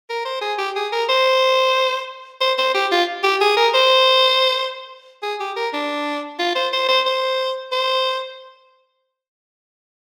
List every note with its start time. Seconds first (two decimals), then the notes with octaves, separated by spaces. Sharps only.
0.09 A#4
0.25 C5
0.41 G#4
0.58 G4
0.76 G#4
0.92 A#4
1.09 C5
2.41 C5
2.58 C5
2.74 G4
2.91 F4
3.23 G4
3.41 G#4
3.57 A#4
3.74 C5
5.23 G#4
5.40 G4
5.56 A#4
5.73 D4
6.39 F4
6.55 C5
6.73 C5
6.89 C5
7.06 C5
7.72 C5